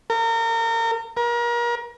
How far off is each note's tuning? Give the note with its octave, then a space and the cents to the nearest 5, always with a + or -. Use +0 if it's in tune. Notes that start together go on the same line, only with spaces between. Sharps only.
A#4 -30
A#4 +35